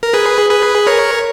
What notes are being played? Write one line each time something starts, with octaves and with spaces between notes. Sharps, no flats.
A#4
G#4 B4
G#4 B4
A#4 C#5